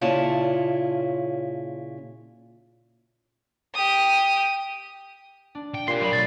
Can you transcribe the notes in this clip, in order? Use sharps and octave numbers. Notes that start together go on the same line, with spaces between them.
A#2 C#3 C#4 E4 F4 A5
G4 D#6
D4
G5
A#2 F4 G4 B4 C6 C7
F#3 G3 D5 D#5 B5
B2 A3 A6